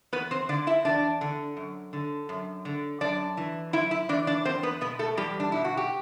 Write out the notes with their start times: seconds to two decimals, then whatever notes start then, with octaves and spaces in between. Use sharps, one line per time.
0.13 E2 B3 B4
0.31 C4 C5
0.49 D3 D4 D5
0.67 E4 E5
0.85 E2 D4 D5
1.21 D3
1.57 F#2
1.93 D3
2.29 F#2
2.65 D3
3.01 F#2 D4 D5
3.37 E3
3.73 F#2 E4 E5
3.91 E4 E5
4.09 E3 D4 D5
4.27 D4 D5
4.45 E2 C4 C5
4.63 B3 B4
4.81 B2 B3 B4
4.99 A3 A4
5.17 E2 G3 G4
5.40 D4
5.52 B2 E4
5.65 F#4
5.77 G4